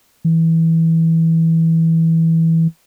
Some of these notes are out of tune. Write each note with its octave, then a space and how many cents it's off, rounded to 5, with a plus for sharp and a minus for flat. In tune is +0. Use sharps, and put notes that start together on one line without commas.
E3 -15